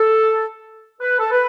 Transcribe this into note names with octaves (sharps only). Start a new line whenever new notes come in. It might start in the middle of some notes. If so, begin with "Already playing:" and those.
Already playing: A4
B4
A4
B4